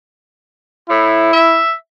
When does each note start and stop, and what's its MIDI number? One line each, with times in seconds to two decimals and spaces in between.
0.90 1.31 45
0.90 1.60 64
1.33 1.73 76